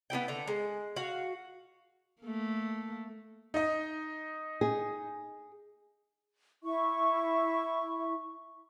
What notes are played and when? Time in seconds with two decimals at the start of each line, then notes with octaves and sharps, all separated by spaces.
0.10 B3 C#4 E4 G5
0.28 D3 A#5
0.48 G#3
0.96 F#4 F5
2.21 A3 A#3
3.54 D#4 D#5
4.61 G#4
6.64 E4 E5 C#6